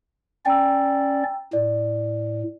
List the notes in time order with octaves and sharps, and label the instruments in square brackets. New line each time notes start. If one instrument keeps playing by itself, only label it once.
[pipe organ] C#4 D5 [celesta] G5 A#5 E6
[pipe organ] A2 [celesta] D5